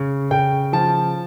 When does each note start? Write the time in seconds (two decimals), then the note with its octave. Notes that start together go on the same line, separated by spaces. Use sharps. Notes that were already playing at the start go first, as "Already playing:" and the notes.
Already playing: C#3
0.31 C#3 G5
0.73 F3 A5